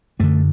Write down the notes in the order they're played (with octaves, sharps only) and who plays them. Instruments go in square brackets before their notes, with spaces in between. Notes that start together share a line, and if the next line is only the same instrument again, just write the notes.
[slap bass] F#2 D3 A3